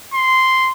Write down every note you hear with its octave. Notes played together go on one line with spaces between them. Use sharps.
C6